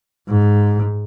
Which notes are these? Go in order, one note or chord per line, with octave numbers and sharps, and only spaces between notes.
G#2